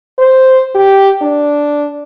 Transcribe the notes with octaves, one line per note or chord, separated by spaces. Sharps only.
C5
G4
D4